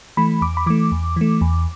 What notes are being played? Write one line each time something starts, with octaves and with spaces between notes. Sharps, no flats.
E3 A3 B5
E2 D6
B5
E3 A3 D6
E2
E3 A3
E2